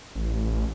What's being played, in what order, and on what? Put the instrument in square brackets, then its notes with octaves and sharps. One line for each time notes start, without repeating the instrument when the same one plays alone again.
[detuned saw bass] A1